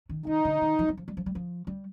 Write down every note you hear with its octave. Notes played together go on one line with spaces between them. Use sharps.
D#3
D#3 D#4
D3
D#3
F3
G3
F3
G3
F3
G3
F3
G3